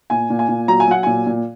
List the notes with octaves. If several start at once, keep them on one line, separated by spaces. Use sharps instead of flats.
A#2 G#5
A#2
G#5
A#2
F#3 A#5
G#5
F#3 F#5
A#2 G#5
A#2